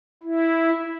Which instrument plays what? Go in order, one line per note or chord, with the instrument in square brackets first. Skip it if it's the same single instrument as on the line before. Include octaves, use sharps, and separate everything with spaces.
[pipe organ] E4